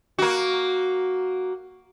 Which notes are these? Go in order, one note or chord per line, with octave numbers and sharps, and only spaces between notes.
A#3 F#4